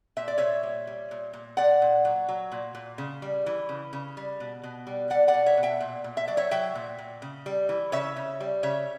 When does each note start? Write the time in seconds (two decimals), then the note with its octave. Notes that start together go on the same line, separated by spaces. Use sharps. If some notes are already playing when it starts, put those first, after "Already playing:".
0.17 A#2 E5
0.28 D5
0.38 A#2 C#5 E5
0.63 G3
0.87 G3
1.11 A#2
1.33 A#2
1.57 A#2 D5 F#5
1.82 A#2
2.05 F#3
2.28 F#3
2.52 A#2
2.75 A#2
2.98 C#3
3.22 G3
3.46 E3
3.69 C#3
3.93 C#3
4.17 G3
4.40 B2
4.63 B2
4.87 G3
5.10 G3 D5 F#5
5.28 D5 F#5
5.34 B2
5.46 C#5 E5
5.57 B2
5.63 E5 G5
5.80 A#2
6.04 A#2
6.17 E5
6.28 F#3 D5
6.37 C#5 E5
6.51 F#3 E5 G5
6.75 A#2
6.98 A#2
7.22 C#3
7.46 G3
7.69 E3
7.92 C#3 C#5 E5
8.16 C#3
8.40 G3
8.63 C#3 C#5 E5